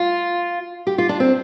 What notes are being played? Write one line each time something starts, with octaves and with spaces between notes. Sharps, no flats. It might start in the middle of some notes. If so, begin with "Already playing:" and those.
Already playing: F4
G4
F4
D4
C4